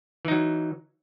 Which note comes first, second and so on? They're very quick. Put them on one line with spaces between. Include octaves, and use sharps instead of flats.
E3 D#4 F#3